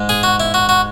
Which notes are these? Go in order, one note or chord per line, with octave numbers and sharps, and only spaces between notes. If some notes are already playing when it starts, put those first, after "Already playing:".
Already playing: G#2 G#3
G#4
F#4
E4
F#4
F#4